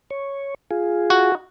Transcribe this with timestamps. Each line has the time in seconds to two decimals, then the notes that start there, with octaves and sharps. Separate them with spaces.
0.11 C#5
0.71 F4 G#4
1.10 F#4